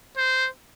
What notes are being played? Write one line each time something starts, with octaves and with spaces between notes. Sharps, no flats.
C5